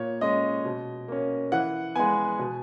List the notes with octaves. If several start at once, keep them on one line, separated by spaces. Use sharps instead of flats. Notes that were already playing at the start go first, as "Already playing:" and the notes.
Already playing: A#2 C#5
G#3 C#4 D#5
B2
A#3 C#4
E3 F#5
G#3 B3 G#5
B2